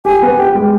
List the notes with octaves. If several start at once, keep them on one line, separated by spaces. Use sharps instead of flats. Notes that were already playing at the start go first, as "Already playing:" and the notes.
G4 G#5
B3
G4 G5
G#3